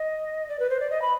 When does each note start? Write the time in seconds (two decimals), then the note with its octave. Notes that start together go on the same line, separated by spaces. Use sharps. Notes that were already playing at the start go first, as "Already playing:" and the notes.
Already playing: D#5
0.49 D5
0.59 B4
0.70 C5
0.80 D5
0.90 D#5
1.02 B5